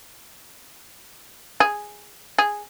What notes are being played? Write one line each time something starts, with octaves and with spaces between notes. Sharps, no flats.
G#4
G#4